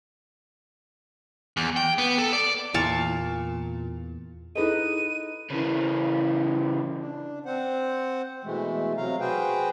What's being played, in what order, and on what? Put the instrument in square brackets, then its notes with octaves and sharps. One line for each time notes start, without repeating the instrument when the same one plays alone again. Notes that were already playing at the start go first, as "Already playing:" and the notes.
[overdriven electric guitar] E2
G5
B3
A4
D5
[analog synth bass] E2 [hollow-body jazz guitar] A#2 [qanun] F5 A5 C#6
[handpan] D#4 B4 D#5 [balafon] E4 G#4 A4 [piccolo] D#7
[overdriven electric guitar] C#3 E3
[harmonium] D4
C4 C5 F#5
B2 E3 G#3 A3
C3 F#3 F5 A#5
F#4 G#4 B4 C5 G5